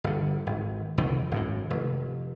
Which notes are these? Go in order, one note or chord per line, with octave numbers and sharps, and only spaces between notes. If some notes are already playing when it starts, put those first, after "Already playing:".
G1 D3
G#1
F1 C2 F2 D#3
G#1 F#2 A2
F1